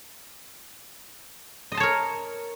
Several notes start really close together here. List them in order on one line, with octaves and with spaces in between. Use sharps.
D#5 C6 A5 C#5 A#4